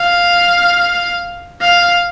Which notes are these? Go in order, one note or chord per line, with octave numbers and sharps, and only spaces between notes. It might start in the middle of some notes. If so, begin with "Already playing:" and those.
Already playing: F5
F5